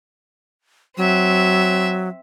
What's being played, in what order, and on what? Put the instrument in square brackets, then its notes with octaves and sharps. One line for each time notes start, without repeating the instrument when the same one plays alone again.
[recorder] F#3 [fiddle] C4 E5